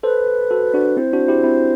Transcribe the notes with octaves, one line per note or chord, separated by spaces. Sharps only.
A4 B4 C5
F#4 A4
D4 F#4
C4 E4 C5
D4 F#4
E4 G4
C4 E4